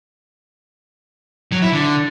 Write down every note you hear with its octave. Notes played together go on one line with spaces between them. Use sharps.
F#3
E4
D3